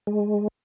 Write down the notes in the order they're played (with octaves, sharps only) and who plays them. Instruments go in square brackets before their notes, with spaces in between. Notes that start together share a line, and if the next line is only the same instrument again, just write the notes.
[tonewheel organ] G#3